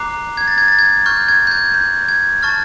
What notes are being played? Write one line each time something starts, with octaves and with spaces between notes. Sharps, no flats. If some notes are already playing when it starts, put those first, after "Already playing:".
Already playing: A#5 D6 F#6 C7
G#6
A6
G#6
A6
G#6
C#6 F6 G6
G#6
G6
G#6
G6
G#6
A5 C#6 F6 A6